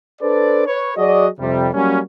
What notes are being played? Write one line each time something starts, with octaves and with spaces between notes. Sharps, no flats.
D4 A4 B4 C5 D5
B4 C#5
F#3 F#4 G#4 D5 D#5
F2 C3 G3
F#3 G3 A#3 C#4